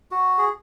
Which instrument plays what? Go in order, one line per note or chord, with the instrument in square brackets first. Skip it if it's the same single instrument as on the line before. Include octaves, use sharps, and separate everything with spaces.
[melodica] F#4
G#4